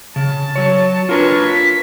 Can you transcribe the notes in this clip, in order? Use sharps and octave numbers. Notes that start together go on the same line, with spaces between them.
C#3 A5
F#3 C#5
D4 F4 A#4 B4 C#5
B6